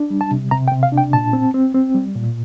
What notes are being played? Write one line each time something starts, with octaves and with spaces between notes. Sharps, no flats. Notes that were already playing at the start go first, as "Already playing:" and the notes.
Already playing: D4
G3
A5
C3
C3 A#5
G5
C3
F5
D4
G5
A#2 A5
C4
C4
C4
G3
A#2